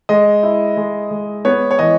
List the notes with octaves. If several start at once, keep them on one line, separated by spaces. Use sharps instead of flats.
G#3 D#5
E4
G#3
G#3
B3 C#5
C#5
E3 D#5